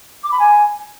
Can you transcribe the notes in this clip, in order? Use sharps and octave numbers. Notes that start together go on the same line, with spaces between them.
D6
B5
G#5